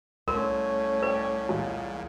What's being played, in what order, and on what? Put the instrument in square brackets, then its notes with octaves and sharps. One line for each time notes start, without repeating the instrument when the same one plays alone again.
[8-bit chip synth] C2 [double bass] A3 C#4 [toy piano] A#4 C6
[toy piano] B4 [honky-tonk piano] C#5 D5 G5
[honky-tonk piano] E2 A#2 G#3